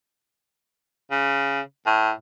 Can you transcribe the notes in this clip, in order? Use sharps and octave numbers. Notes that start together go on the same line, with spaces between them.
C#3
A2